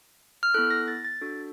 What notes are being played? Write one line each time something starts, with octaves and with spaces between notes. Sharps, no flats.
F6
B3 E4 A4 F#6
A#6
A6
A6
D4 F#4 A4